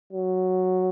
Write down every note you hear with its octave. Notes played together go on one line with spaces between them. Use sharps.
F#3